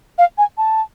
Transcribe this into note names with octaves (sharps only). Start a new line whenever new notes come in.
F5
G#5
A5